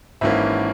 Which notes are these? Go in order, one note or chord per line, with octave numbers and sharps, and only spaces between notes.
G#1 G#2 E3 A#3 C#4 E5